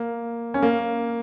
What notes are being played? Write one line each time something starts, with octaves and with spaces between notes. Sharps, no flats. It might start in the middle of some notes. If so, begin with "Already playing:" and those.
Already playing: A#3
C#4
A#3